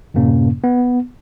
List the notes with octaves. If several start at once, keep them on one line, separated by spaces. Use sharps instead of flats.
F#2 A2 C3 A#3 C#4
B3